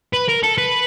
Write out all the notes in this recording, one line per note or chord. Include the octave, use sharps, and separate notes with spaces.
B4
A#4
A4
B4